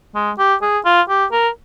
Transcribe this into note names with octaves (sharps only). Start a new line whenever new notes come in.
G#3
G4
G#4
F4
G4
A#4